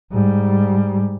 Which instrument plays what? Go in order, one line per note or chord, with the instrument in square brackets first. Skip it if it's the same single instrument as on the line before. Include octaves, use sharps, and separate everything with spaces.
[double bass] G#2 G3